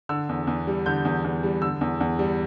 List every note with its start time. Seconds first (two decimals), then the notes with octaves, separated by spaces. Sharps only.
0.09 D3 E6
0.29 E2
0.47 E2
0.67 G3
0.86 D3 G6
1.05 E2
1.24 E2
1.43 G3
1.62 D3 E6
1.81 E2
2.00 E2
2.19 G3